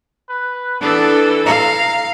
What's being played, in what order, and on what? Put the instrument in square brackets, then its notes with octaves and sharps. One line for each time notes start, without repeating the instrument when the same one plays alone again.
[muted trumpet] B4
[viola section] E3 A4 [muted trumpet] B3 [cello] D4
[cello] F5 [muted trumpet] A#5